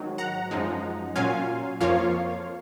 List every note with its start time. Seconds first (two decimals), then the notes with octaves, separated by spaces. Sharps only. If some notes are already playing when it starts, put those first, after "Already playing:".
Already playing: G#2 D#3 F#3
0.18 F#5 A#5
0.51 F#2 F3 G#3 D#4
1.16 A#2 F#3 C#4 F4 F5 G#5
1.81 F2 F3 A#3 F4 C#5 F5